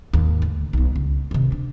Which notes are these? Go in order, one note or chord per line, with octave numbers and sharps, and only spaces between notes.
D#2 G#2
D2
B1 B3
C#2
C3 D#3
D4